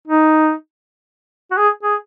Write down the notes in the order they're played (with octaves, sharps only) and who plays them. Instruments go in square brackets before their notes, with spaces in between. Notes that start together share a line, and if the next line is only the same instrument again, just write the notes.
[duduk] D#4
F#4
G#4
G#4